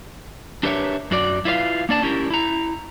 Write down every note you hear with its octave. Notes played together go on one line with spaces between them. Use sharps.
D4 G4 A#4 B4 C#5 E5
F#2 F#4 D5
E4 F4 B4 C5 F5
A#3 D4 D5 A5
C#4 E4 G4 A#4
E4 A#5